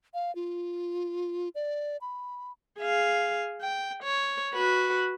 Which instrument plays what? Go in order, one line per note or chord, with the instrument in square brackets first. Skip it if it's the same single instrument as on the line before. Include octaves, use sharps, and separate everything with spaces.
[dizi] F5
F4
D5
B5
[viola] G#4 F5
G5
C#5
F#4 B4